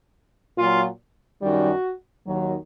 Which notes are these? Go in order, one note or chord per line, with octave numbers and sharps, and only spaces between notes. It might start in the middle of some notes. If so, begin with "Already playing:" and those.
A#2 F#3 F4
F#2 D#3 G3 F#4
D#2 D#3 F#3